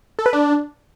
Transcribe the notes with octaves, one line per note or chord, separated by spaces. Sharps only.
A4
B4
D4